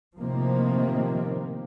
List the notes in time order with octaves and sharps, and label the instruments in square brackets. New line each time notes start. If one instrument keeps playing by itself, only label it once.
[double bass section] A2 C3 D#3 F3 A#3 C4